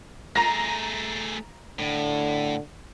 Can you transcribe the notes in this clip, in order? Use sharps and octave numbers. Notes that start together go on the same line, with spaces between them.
A3 G#4 A#5 A#6
A2 D3